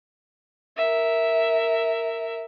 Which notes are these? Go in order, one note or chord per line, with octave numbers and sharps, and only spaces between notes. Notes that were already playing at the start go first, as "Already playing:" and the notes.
A#4 E5